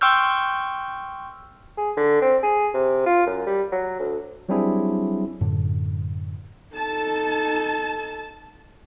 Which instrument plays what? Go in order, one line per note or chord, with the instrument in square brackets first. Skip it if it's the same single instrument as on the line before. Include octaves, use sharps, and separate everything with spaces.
[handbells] G5 C6 C#6 E6 F6 G6
[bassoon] G#4
D3
C4
G#4
C3
F4
F#2
G3
F#3
D2
[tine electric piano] F#3 G3 C4 D4 E4 G#4
[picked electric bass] F#2 A2 D3
[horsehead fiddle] D#4 A4 [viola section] A5